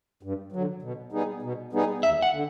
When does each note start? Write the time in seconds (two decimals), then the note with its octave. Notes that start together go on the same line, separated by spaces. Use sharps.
0.23 G2
0.52 D3 F#3
0.82 B2
1.12 G3 B3 D#4 G#4
1.42 B2
1.73 G3 B3 D#4 G#4
2.03 D#2 E5
2.22 F#5
2.33 D3